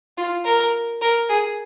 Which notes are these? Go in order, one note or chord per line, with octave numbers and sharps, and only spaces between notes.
F4
A#4
A#4
G#4